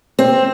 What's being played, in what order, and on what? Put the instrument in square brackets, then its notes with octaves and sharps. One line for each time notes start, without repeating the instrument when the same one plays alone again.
[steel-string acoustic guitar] C4